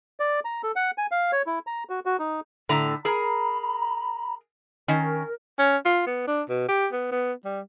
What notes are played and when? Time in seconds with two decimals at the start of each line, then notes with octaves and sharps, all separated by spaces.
0.20 D5
0.45 A#5
0.63 A4
0.76 F#5
0.98 G#5
1.11 F5
1.32 C#5
1.46 E4
1.67 A#5
1.89 F#4
2.06 F#4
2.19 D#4
2.69 A2 D3 A#5
3.05 G#4 A#4 A#5 B5
4.88 D#3 C#4 A#4
5.59 C#4
5.85 F4
6.07 B3
6.27 D4
6.49 B2
6.68 G4
6.93 B3
7.12 B3
7.45 G3